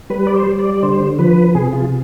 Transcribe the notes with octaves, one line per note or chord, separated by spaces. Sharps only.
G3 B4
D5
C5
G3
D5
D5
D3 C5
F3 B4
C3 G#4
F4